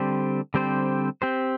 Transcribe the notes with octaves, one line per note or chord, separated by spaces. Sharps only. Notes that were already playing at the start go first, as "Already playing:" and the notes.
Already playing: D3 G3 C4 G4 C5
D3 G3 C4 G4 C5
C4 G4 C5